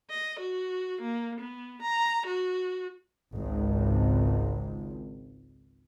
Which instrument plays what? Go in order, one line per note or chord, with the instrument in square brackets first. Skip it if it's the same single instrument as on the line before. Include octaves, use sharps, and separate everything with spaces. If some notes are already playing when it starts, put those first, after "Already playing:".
[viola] D#5
F#4
A#3
B3
A#5
F#4
[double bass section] G#1 C#2